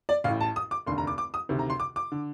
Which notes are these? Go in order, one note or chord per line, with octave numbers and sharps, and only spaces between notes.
D5
A1 A2 F5
A5
D#6
D6
F1 D#2 D3 C6
A#5
D6
D6
D#6
D2 C3 D#3
A#5
C6
D6
D6
D3